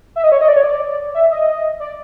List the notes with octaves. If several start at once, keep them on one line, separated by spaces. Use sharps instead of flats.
E5
D#5
C#5
D#5
D5
C#5
D5
E5
D#5
D5